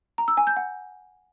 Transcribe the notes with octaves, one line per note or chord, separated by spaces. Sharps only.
A#5
E6
G#5
G6
F#5